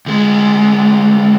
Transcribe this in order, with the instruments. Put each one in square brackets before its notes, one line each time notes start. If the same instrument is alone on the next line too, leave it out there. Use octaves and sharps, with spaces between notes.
[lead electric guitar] D2 G#3